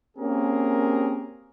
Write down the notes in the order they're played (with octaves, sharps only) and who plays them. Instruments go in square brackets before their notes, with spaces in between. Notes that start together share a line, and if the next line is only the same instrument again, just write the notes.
[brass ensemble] A#3 C4 C#4 G4 G#4 A#4